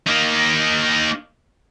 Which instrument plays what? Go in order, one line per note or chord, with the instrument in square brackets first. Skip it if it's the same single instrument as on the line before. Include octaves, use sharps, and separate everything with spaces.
[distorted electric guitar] A#3 D#4